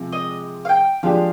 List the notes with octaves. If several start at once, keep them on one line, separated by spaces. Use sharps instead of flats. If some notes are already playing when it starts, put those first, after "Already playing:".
Already playing: C3 F3 G#3
D#5
F5
G5
F3 G#3 D4 G4 F5